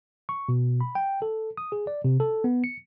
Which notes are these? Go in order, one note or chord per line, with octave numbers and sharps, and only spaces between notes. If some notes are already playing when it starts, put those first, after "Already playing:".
C#6
B2
B5
G5
A4
D#6
G#4
D5
C3
A4
B3
C#7